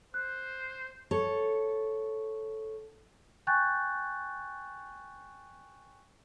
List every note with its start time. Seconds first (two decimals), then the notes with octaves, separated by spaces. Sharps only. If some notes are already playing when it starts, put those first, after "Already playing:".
0.14 C5 F#6
1.11 A4 C#5
3.47 G5 G#5 C#6 F#6 G6 A6